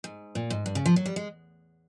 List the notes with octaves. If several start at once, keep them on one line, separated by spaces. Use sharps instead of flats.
G#2
A#2
G#2
G2
C#3
F3
F#3
G3
G#3